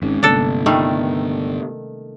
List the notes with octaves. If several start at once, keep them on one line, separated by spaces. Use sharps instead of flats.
G#1 G#2 G#3 C4 C#4
G1 C3 A#3 D4 A4
D#3 G3 A3